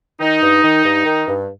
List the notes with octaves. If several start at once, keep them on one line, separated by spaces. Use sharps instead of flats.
D#3 D#4
G2
D#3
G2
D#3
G2